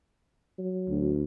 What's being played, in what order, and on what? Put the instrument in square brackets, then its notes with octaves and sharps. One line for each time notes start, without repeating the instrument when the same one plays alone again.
[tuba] F#3
[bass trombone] D2